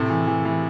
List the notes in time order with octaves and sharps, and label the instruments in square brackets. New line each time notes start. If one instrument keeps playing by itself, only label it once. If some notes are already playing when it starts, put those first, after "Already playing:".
Already playing: [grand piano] A2 A3 [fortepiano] C3
[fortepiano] E3
E3
E3